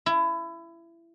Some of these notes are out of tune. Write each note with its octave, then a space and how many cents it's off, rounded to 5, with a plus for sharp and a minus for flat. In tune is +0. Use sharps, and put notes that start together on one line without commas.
E4 +25